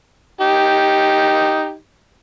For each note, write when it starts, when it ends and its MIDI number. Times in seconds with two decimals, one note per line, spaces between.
0.41 1.75 63
0.41 1.75 67